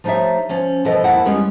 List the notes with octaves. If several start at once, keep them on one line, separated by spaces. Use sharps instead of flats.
F3 A3 D#4 G4 C#5 E5
F3 C#4
B2 E3 F3 A4 B4 D#5
F2 A#3 E4 F#5 A5
E2 G3 G#3 B3 C#4